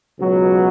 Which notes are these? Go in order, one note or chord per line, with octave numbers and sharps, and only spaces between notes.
C#2 B2 F#3